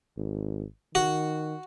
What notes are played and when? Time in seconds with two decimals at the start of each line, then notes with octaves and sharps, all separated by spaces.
0.17 G#1
0.95 D#3 F#4